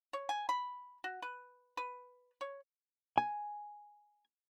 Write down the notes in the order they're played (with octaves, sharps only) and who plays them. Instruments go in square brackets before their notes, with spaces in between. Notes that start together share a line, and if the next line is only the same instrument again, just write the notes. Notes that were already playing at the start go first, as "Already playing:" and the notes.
[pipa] C#5
G#5
B5
F#4
B4
B4
C#5
[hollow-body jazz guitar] G#5